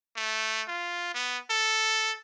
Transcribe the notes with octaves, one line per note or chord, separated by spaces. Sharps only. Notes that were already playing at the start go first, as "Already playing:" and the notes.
A3
F4
B3
A4